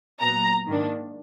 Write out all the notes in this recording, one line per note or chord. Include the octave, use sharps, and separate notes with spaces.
A#2 F#3 B3 A#5
G#2 D#3 A#3 D4